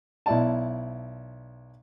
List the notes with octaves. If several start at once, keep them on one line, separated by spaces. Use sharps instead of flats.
B1 E4 D5 A5